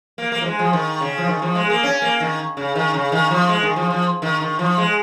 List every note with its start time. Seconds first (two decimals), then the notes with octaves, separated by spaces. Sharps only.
0.18 A#3
0.32 A#3
0.41 F3
0.46 G#3
0.59 F3
0.73 D#3
1.01 C#3
1.18 F3
1.28 D#3
1.42 F3
1.55 G#3
1.70 A#3
1.83 C#4
2.02 A#3
2.20 D#3
2.57 C#3
2.75 D#3
2.94 C#3
3.12 D#3
3.31 F3
3.49 G#3
3.63 D#3
3.76 F3
3.90 F3
4.22 D#3
4.41 D#3
4.59 F3
4.78 G#3